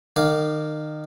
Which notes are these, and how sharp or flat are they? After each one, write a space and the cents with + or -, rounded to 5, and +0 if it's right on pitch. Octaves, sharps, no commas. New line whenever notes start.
D#3 -30 F5 +0 D6 +0